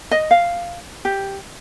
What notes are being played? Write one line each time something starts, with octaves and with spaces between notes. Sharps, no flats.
D#5
F5
G4